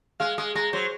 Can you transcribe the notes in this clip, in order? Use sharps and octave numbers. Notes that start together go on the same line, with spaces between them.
G#3 F5
G#3 D#6
G#3 A#5
F#3 C5